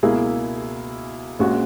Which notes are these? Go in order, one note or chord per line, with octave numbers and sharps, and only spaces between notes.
C#2 B2 A#3 E4 G#4
A#1 A#2 G#3 C#4 F#4